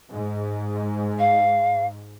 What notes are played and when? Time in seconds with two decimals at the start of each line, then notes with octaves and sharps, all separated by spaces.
0.12 G#2
1.19 F5